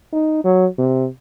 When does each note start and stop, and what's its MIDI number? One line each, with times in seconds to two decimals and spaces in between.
0.13 0.40 63
0.44 0.66 54
0.78 1.07 48